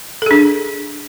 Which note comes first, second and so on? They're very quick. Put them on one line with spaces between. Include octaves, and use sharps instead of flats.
A4 G#4 D4